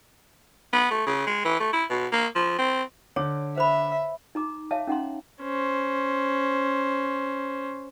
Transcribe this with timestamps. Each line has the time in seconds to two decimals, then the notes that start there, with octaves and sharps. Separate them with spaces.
0.73 B3
0.91 A3
1.07 C#3
1.27 G#3
1.45 E3
1.60 A3
1.73 E4
1.90 B2
2.13 A#3
2.35 F3
2.59 C4
3.16 D3 C#5 D6
3.58 C5 E5 B5
4.35 D#4 A#5 D6
4.71 C#5 E5 F5 A5
4.87 C#4 D#4 F#5 A#5 C6
5.42 C#4 C5